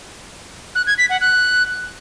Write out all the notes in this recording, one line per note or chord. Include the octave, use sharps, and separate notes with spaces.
F#6
G#6
B6
F#5
F#6